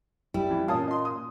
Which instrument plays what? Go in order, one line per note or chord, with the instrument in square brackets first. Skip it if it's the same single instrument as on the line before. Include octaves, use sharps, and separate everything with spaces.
[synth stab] A1 [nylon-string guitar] G3 E4
[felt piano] F2 E3
[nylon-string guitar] A#2 [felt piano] C#4 F4 [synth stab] F5 A5 D#6
[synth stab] D#5 C6
[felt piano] D#6